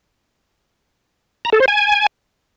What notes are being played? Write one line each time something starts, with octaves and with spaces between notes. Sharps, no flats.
A#5
A4
C5
G#5